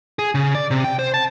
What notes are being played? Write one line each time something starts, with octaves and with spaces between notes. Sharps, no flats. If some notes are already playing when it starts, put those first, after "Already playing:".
G#4
C#3
D5
C3
G5
C5
A5